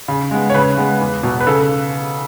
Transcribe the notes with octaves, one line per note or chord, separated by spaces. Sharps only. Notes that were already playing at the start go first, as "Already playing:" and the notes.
C#3
G#3 B3
C#5
C#3 B4
G#3 B3
E2
B2 F#3
B4
C#3 A4